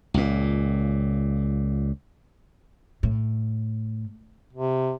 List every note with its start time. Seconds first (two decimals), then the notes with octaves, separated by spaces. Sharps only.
0.14 C#2 A#2
3.03 A2
4.53 C3